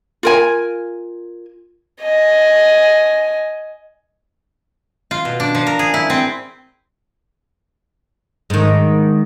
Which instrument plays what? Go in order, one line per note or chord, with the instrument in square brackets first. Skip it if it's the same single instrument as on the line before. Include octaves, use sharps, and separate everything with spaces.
[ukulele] F4 A#4 G#5
[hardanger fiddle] D#5 G#5
[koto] F4
B2
D4
F3
A#4
G#4
E4
C4
[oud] G#2 D#3